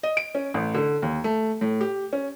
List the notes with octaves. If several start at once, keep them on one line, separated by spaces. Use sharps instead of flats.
D#5
D7
C#4
A1
D3
D#2
A3
A2
G4
C#4